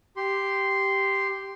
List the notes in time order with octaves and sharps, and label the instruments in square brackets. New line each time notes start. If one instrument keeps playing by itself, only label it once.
[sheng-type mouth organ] G4 C6